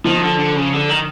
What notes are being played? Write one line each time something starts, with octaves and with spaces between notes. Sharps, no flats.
D#3 F3
D3
D3
C#3
D3
D#3